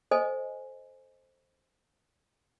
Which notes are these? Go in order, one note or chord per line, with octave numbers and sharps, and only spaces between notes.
A4 C5 D#5 G#5